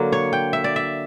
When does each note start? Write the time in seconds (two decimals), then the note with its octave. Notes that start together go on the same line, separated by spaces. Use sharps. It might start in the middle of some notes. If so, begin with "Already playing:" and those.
Already playing: D3 F#3 A#3
0.12 C#5
0.33 G5
0.53 E5
0.64 D5
0.76 E5